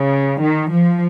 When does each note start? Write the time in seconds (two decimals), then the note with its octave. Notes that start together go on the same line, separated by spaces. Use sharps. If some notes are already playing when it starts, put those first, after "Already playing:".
Already playing: C#3
0.41 D#3
0.71 F3